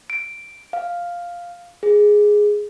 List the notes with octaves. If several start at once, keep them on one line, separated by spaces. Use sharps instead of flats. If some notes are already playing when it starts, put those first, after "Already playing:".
D7
F5
G#4